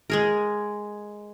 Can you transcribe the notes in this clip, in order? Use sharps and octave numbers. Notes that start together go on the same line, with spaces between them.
G#3 G#4 A#4